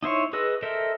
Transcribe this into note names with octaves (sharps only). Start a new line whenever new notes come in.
D#4 E4 C5 C#5
G#4 B4 D#5 E6
A4 A#4 C5 D#5 E5